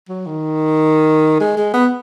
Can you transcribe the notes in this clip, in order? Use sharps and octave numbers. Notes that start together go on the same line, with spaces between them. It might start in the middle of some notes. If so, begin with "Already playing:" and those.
F#3
D#3
G#3
G#3
B3